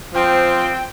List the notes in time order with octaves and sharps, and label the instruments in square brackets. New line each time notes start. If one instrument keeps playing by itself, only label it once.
[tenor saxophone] F3 [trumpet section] C4 [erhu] G5